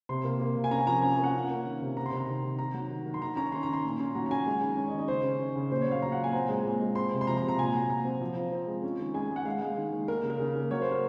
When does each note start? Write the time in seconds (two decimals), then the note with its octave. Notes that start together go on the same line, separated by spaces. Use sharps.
0.09 C3 C6
0.24 A#3
0.40 A#3
0.56 C3
0.64 G#5
0.71 C#4 A#5
0.79 G#5
0.87 F3 A#5
1.02 C#4 G#5
1.18 A#3
1.24 F#5
1.34 C#4
1.50 A#3
1.65 D#3
1.81 C3
1.97 C3 A#5
2.06 C6
2.13 C3 A#5
2.28 D#3
2.43 D#3
2.58 D#3 A#5
2.74 F#3
2.90 D#3
3.06 D#3
3.14 C6
3.21 D#3 A#5
3.36 C#4 A#5
3.52 D#3 C6
3.63 A#5
3.69 D#3 C6
3.84 A#2
4.00 C#4
4.15 F#3 A#5
4.26 A#5
4.30 C#4 G#5
4.46 G#3
4.62 D#3
4.77 C#4
4.88 D#5
4.94 D#3
4.99 D#5
5.08 C#3 C5
5.24 C#4
5.39 C#4
5.56 C#3
5.71 A#2 C5
5.81 C#5
5.87 F#3 F5
6.02 F#3 A#5
6.12 F#5
6.17 A#2
6.24 G#5
6.33 C4 A#5
6.49 G#3
6.65 A#2
6.80 G#3
6.95 C4 C6
7.12 C3
7.21 C6
7.27 F3 A#5
7.37 A#5
7.42 C3
7.48 A#5
7.58 A#2 G#5
7.74 F#3 A#5
7.90 A#2 A#5
8.05 C4
8.21 F3
8.36 F3
8.52 C4
8.67 G#3
8.83 C#4
8.99 D#3
9.14 G#3 G#5
9.30 G#3
9.36 F#5
9.45 G#3 F5
9.61 G#3
9.77 D#3
9.93 D#3
10.08 A#3 A#4
10.23 C#3
10.30 A#4
10.39 C#3
10.55 A#3
10.71 F#3 C#5
10.82 C5
10.87 C#3 A#4